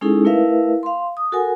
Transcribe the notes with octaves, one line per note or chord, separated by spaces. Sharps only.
G#3 C#4 D#4 E4 G#4 A4
A3 E4 A#4 B4 E5 F5
F5 C6
D#6
F#4 A4 A#4 F#5 G#5